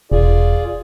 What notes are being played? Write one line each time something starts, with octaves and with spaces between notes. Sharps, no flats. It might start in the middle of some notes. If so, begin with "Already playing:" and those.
E1 F4 G#4 D5